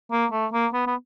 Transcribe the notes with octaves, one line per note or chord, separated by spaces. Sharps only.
A#3
A3
A#3
B3
B3